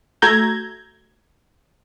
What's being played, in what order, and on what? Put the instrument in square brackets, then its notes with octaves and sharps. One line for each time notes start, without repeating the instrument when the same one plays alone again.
[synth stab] A3 F#4 E5 A#5 G6 G#6